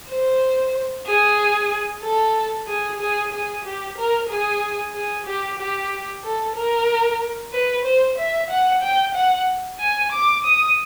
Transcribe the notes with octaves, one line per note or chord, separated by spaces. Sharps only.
C5
G#4
A4
G#4
G#4
G#4
G4
A#4
G#4
G#4
G4
G4
A4
A#4
B4
C5
E5
F#5
G5
F#5
G#5
D6
D#6